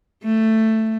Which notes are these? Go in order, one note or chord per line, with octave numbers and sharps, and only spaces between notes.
A3